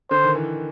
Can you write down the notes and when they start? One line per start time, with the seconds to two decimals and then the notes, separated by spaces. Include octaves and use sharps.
0.11 D3 C5
0.24 D#3
0.35 E3